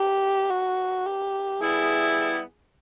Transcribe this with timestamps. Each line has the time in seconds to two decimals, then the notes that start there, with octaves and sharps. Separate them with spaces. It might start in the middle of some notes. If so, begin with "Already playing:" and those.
Already playing: G4
0.50 F#4
1.06 G4
1.61 G3 B3 E4 G#4